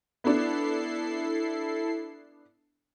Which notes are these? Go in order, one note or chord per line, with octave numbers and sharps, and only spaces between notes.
B3 D4 E4 A4 C7